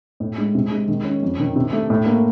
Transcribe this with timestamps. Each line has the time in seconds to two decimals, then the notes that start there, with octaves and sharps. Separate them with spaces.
0.20 A2
0.38 G#3
0.55 C3
0.71 G#3
0.88 D#3
1.05 C#4
1.23 F2
1.40 D#3
1.56 C3
1.73 A3
1.90 A2
2.06 A#3